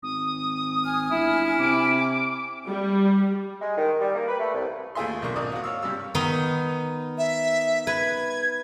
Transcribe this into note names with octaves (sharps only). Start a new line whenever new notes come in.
G#1 D#6
G#5 F6
G1 E4
C3 D6
G3
G#3
D#3
G3
A#3
B4
A3
C2
D#2 A3 F4 G#4 E5 C6
B1 D3 A#3 C#6
G#1 A#3 D5 D#6
F4 F#4
C#5 F5 E6
G2 C3 G3 E6
D#3 B3 D#4
E5
B4 G#6